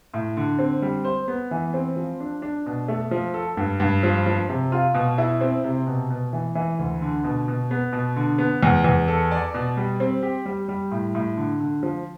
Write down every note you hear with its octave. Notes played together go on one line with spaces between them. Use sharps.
A2
D3
C4
G3
C5
B3
E3
C4
F3
D4
D4
B2
A3
F3
A4
G2
G2
F3
F3
C3
F4
B2
E4
C4
C3
B2
B2
E3
E3
D2
D3
B2
B2
B3
B2
D3
B3
E2
E2
A4
D5
B2
G3
C4
G4
G3
G3
A2
A2
D3
D3
F3